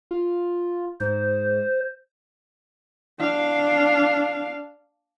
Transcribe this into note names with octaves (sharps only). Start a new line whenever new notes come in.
F4
G#2 C5
D4 F5